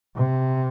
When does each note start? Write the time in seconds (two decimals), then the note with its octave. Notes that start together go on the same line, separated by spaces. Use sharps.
0.17 C3